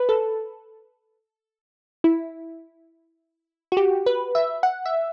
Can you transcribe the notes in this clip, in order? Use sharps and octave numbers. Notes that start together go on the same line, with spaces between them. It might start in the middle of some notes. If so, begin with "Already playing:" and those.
Already playing: B4
A4
E4
F#4
G4
B4
E5
F#5
E5